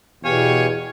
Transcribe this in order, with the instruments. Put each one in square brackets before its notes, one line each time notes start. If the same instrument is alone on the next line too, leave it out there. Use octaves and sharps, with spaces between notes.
[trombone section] E2 [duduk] B2 [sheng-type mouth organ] G4 F5 G#5 [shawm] C#5